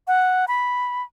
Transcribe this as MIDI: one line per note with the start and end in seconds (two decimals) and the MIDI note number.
0.08 0.45 78
0.48 1.03 83